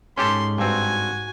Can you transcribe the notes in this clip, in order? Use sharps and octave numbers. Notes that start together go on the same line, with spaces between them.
G#2 C#4 G4 A4 C6
G2 C4 F#4 G#5